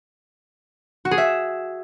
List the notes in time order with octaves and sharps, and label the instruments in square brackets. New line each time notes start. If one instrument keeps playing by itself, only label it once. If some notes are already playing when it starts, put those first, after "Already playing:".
[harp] F#4
G#4
E5